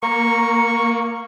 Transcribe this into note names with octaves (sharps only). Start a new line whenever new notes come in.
A#3 A#5 C#6